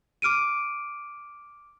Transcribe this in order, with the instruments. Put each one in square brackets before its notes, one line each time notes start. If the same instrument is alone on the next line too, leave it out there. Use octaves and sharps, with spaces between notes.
[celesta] D6 F6 D7 D#7